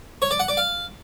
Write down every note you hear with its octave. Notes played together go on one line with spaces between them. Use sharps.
C#5
D5
F#5
D5
F5